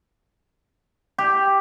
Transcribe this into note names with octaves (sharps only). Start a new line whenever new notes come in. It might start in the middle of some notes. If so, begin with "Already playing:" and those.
G4